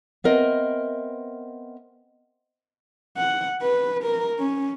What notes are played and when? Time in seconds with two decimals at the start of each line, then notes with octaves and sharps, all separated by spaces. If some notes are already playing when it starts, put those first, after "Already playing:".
0.24 B3 C4 A#4 D#5 E5
3.17 F#5
3.62 B4
4.03 A#4
4.40 C#4